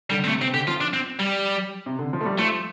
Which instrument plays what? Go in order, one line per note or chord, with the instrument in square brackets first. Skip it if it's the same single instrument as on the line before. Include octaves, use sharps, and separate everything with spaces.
[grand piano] D3 [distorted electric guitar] G3
[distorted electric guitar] C4
[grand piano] C3 [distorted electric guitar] A3
[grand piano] C3 [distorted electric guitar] C4
[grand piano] D3 [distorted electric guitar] G4
[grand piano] F3 [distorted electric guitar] F4
[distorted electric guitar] D4
C4
G3
[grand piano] C3
D3
F3
A3
G3
[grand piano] F3 [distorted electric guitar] A3